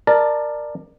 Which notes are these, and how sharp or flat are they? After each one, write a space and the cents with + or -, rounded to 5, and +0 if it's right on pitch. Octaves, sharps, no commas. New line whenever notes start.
A#4 +0 D5 +20 A5 +0